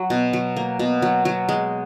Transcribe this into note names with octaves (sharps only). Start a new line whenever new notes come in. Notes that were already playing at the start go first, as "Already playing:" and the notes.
Already playing: F#3
B2
F#3
A#3
B2
F#3
F#3
G#3